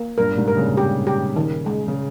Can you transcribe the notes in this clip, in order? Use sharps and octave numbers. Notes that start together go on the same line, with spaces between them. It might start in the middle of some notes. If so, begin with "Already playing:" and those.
Already playing: A#3
G2 A#2 A#4
A#2
G#2 C3
A#4
A#2 C#3
G4
G4
D#3
G#3
C#3